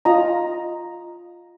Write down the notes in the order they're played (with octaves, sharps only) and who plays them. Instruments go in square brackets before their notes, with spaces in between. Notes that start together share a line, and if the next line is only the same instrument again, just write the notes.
[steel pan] F4 D#5 A#5